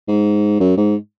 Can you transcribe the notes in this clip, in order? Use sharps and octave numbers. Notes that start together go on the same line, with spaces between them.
G#2
F#2
G#2